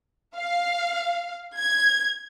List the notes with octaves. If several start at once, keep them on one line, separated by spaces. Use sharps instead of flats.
F5
G#6